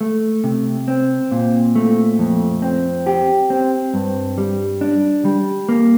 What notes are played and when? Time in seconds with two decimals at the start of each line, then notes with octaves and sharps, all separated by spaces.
0.01 A3
0.44 C3
0.88 C4
1.31 A#2
1.75 A3
2.19 F2
2.62 C4
3.07 G4
3.50 C4
3.94 G2
4.38 G3
4.81 D4
5.25 G3
5.69 A#3